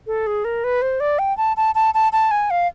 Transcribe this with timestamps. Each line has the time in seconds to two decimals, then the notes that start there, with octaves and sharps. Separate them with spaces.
0.07 A4
0.27 G#4
0.45 A#4
0.64 B4
0.82 C5
1.00 D5
1.19 G5
1.37 A5
1.57 A5
1.75 A5
1.94 A5
2.12 A5
2.31 G#5
2.51 F5